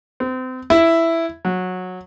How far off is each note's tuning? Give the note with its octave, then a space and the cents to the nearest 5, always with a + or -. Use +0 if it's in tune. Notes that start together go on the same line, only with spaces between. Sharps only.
C4 -30
E4 +5
F#3 -15